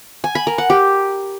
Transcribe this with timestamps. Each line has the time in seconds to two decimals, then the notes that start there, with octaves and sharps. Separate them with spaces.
0.24 G#5
0.35 B5
0.47 A#4
0.58 F#5
0.70 G4